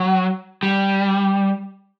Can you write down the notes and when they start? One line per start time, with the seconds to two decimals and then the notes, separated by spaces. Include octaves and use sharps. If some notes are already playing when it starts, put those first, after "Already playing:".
Already playing: F#3
0.63 G3